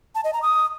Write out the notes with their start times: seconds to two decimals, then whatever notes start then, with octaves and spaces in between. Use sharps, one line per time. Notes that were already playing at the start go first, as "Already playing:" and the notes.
0.15 A5
0.24 D#5
0.33 A#5
0.42 D#6